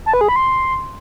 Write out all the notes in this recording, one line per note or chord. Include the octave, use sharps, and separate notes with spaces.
A5
B4
G#4
B5
C6